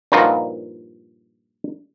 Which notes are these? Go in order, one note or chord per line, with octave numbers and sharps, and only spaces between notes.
G2 A#2 F3 D#4 F4 F#4